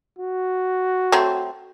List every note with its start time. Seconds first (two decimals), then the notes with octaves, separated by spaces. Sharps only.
0.19 F#4
1.12 F#3 A3 C4